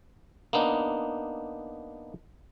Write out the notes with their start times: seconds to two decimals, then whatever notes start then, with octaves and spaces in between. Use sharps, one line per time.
0.53 A#3 B3 D4 D#4